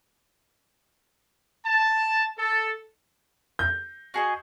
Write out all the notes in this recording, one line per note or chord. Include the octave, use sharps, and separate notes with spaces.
A5
A4
G6
F#4 G#4 D#5